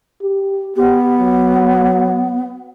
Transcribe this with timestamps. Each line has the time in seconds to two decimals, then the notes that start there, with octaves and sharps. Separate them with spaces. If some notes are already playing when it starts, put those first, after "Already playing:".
0.23 G4
0.76 B3 G4
1.18 F#3